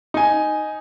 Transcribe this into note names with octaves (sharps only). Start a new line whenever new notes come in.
D#4 G#5